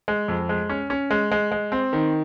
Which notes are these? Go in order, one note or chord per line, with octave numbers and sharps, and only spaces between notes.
G#3
F2
G#3
C#4
C#4
G#3
G#3
G#3
C4
D#3